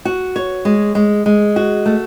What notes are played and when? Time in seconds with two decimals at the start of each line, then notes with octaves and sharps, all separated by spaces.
0.05 F#4
0.36 C#5
0.65 G#3
0.95 G#3
1.26 G#3
1.56 F#4
1.86 A3